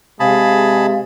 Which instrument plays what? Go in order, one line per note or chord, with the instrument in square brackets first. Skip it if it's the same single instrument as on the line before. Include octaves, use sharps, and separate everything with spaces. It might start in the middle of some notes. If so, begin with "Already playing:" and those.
[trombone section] C3 G#3 [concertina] G#4 A5 B5 [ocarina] F5